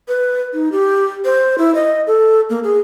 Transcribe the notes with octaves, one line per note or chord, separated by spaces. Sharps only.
B4
D#4
G4
C5
E4
D#5
A4
A#3
G#4